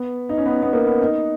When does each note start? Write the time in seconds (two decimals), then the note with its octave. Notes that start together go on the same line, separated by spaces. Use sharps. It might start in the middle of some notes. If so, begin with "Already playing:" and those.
Already playing: B3
0.29 D#4
0.38 C#4
0.46 B3
0.63 B3
0.73 A#3
0.87 B3
1.01 D#4